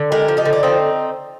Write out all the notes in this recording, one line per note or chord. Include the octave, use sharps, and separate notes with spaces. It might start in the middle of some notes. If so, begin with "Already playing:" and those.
Already playing: D3
G#3 G4 A#4
F3
D#4 G4
D3
D4
F3 C4 D#4